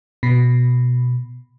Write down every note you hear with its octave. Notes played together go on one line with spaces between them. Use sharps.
B2